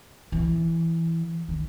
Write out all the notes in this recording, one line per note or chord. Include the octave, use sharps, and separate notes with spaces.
E3
D#3